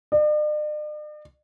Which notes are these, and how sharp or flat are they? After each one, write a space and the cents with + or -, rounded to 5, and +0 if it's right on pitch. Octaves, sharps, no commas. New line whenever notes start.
D5 +45